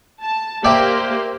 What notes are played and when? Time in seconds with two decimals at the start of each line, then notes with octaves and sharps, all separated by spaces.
0.24 A5
0.65 A#3 G4 C5 D5 E5 G5